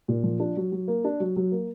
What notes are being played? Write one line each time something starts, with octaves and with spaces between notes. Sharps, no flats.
A#2
F3
D4
F#3
F#3
A#3
D4
F#3
F#3
A#3